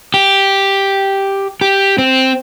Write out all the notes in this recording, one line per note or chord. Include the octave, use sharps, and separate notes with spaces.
G4
G4
C4